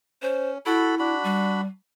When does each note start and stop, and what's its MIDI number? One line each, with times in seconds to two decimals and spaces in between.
0.22 0.58 61
0.22 0.50 72
0.66 1.15 64
0.66 0.95 66
0.66 0.95 69
0.66 0.95 83
0.99 1.61 62
0.99 1.61 66
0.99 1.61 83
1.24 1.66 55